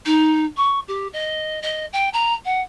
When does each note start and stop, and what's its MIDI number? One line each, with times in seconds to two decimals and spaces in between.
0.05 0.45 63
0.57 0.79 85
0.88 1.08 67
1.13 1.59 75
1.62 1.86 75
1.93 2.09 79
2.13 2.33 82
2.45 2.60 78